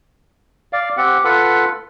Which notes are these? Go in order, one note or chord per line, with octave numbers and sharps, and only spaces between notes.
D5 F5
C4 G4 F#5
F4 A4 B4 F#5